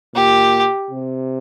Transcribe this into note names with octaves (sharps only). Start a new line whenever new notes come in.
A#2 G4
C3